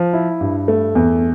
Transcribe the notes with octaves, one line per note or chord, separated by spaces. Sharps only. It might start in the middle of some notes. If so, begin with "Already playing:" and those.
Already playing: F3
E4
G2
A3
E2